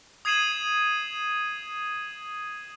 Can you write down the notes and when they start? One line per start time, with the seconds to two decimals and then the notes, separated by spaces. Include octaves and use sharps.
0.25 D#6 G#6 C7 D#7 E7 F#7